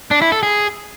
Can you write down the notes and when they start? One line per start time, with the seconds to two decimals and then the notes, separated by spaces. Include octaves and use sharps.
0.11 D4
0.22 E4
0.32 A4
0.43 G#4